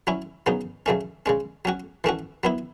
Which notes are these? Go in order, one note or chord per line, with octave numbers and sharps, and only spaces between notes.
F#3 C#4 E4
C#3 F#3 B3 D#4
C#3 F#3 A3 C#4
C#3 G#3 C#4
F#3 C#4 F#4
E3 A3 C#4 F#4
F#3 B3 E4